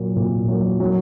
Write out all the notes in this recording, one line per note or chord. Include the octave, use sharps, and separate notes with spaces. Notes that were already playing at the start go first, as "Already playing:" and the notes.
Already playing: A#2 F#3 A#3
A#2
F#3 A#3
F#3